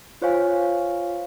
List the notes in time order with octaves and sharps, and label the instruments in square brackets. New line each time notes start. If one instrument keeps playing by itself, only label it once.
[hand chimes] F4 C5 C#5 F5 G#5